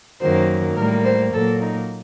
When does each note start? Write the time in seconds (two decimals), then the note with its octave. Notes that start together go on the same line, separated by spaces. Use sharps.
0.21 F#2 D#3 F#3 A#3 C5
0.77 A2 G3 A#3 A#4
1.05 C5
1.33 A#2 F#3 A#3 A4
1.62 D#4